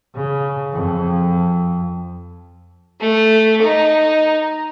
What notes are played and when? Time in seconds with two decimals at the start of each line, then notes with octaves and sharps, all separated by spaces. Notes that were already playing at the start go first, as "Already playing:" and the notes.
0.15 C#3
0.73 F2
3.01 A3
3.62 D#4